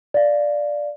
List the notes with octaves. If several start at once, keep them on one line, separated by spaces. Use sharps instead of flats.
D5 F5